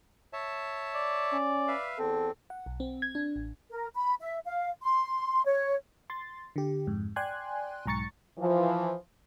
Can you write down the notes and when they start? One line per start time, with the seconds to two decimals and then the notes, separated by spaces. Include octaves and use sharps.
0.33 C#5 E5 A5
0.95 D5
1.33 C#4
1.68 B4 E5 F5
1.99 E2 C4 A4
2.50 F#5
2.66 B1
2.80 C4
3.02 G#6
3.15 D4
3.36 A1
3.71 A#4
3.94 B5
4.21 E5
4.46 F5
4.83 C6
5.45 C#5
6.10 C6 A6
6.56 D3 G4
6.87 F2 G#2
7.16 D5 G5 G#5 C6 F#6 G#6
7.86 B1 G#2 A#5 C#6 A6 C#7
8.38 E3 F3